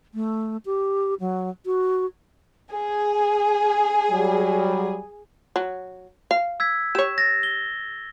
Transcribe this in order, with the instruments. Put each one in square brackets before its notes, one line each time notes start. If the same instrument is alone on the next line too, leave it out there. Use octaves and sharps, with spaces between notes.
[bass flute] A3
G4
F#3
F#4
[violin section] G#4 [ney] G#5
[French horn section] F#3 G3
[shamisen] F#3
F5
[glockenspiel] E6 G#6 B6
[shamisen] G4 C#5 [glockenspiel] E7
[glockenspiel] A6 A#6
G7